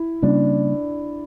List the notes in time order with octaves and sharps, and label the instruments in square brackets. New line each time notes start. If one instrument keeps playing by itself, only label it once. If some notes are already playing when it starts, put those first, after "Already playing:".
Already playing: [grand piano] E4
[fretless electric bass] C#3 G3 A#3 C#4 [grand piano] D4